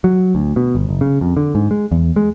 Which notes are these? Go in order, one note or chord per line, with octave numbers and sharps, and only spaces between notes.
F#3
D2
B2
G1
F#1
C#3
F2
D3
G#2
G#3
E2
G#3